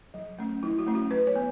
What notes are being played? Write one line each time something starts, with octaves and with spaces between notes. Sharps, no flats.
F#3
A3 C#4
F#3 E4
F#4
A3 C#4
F#4
F#3 B4
C#5
B3